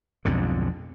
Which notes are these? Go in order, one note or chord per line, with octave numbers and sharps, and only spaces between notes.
B1 F2 G#2 D3